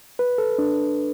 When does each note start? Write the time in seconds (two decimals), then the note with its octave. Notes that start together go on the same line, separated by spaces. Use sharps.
0.19 B4
0.38 A4
0.58 D4